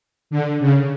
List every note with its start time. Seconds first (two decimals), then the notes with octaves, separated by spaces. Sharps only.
0.30 D3
0.60 C#3